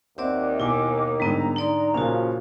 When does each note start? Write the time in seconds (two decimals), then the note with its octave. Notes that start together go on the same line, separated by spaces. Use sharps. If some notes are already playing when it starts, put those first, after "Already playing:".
0.18 D#2 C4 D5 E5 F#5 D6
0.60 B2 E4 G#5 D6
1.20 G#2 D3 G3 B3 E4 A#5
1.56 D#4 D5 A#5 C6
1.94 A#2 C#3 F3 A#3 C#4 F#4